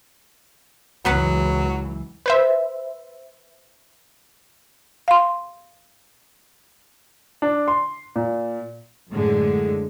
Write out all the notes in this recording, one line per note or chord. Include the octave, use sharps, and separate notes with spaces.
C#2 F#2 E3 F#3 B3 B4 F#5
B4 C5 E5
F5 C6
D4
C6
A#2
F#2 A2 D3 G#3